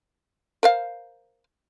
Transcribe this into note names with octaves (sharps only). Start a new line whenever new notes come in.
A#4 C5 F5